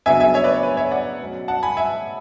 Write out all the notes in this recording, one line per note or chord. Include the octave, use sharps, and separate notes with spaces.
C#3 F#3 B3 D4 E5 G#5
E5 G#5
C#5 E5
B4 D5
C#5
B4
C#5 E5
D5 F#5
B2 F#3 C#4
F#5 A5
G#5 B5
E5 G#5